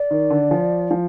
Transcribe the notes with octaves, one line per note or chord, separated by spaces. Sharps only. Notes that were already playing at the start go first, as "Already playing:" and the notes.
Already playing: D5
D#3
D3
F3
F3